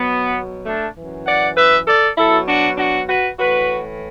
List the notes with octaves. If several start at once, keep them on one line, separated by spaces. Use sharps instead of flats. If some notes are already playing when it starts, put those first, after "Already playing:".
Already playing: B2 F#3 B3
A3 D4
F#2 E3
D5 F#5
B4 E5
A4 D5
B2 F#3 E4 A4
D4 F#4
D4 F#4
F#4 B4
A2 E3 F#4 B4